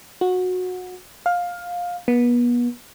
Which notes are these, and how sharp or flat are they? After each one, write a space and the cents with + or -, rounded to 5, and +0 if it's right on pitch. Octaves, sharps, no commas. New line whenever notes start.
F#4 -20
F5 +15
B3 -35